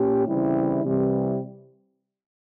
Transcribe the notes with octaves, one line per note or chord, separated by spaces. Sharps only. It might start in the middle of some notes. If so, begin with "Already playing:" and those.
Already playing: A#2 C#4 G4
C#3 E3 G3 C4 E4
C3 E3 G3